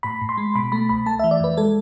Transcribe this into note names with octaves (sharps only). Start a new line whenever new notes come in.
A2 B5
A2
C6
G#3
B2 B5
A3 B5
C2 B5
A3 A5
E5
E3
D5
F2 B4
G#3 A4